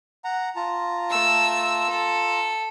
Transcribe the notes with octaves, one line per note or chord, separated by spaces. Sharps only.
F#5 A#5
F4 A5 A#5
A3 E6
A4